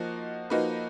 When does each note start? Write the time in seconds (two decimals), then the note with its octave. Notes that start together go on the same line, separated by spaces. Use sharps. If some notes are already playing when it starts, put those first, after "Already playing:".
Already playing: F3 A#3 D#4 F#4
0.50 F3 A#3 D#4 F#4 B4